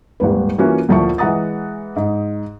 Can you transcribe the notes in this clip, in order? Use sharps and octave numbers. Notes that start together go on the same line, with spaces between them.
D#1 G#1 D#2 B4
E3 A#3 C#4 F4 F#4
D2 A#2 F3 E4 A5 C#6
E3 G#3 F#5 A#5 D#6 A6
G#2